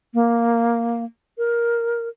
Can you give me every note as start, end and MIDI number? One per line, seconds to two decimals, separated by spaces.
0.14 1.05 58
1.38 2.09 70